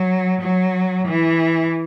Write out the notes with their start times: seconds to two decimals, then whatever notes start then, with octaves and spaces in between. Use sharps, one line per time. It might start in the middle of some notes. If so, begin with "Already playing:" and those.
Already playing: F#3
0.41 F#3
1.07 E3